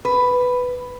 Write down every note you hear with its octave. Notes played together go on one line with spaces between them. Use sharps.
B4